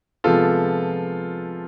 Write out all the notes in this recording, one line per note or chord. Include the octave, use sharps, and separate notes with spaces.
C3 F3 G#3 B3 F4 A4